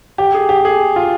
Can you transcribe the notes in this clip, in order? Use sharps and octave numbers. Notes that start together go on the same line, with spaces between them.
G4
G#4
G4
G#4
F4